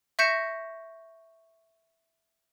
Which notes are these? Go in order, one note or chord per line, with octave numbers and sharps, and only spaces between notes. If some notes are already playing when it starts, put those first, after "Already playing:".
E5 C#6 G6 A#6 C#7 E7